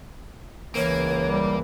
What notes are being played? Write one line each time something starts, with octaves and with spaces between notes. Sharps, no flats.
C#2 E3 A#3 C#5
G3